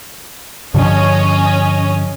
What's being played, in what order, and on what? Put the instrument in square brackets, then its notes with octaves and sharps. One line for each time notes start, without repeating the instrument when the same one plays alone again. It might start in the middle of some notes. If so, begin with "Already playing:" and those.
[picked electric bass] G2 D3 F3 [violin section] C#4 D#5